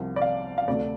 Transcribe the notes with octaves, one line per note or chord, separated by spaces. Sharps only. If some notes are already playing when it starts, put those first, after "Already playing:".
Already playing: C2 C3 F3
D5
F5
F5
D2 C3 A3 D5